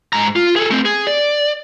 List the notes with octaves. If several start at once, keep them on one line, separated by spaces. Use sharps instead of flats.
G#2 A#5
F4
G#4 A4
A3 C4
G#4
D5